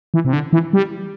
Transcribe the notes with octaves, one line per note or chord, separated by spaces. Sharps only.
E3
C3
D3
E3
G3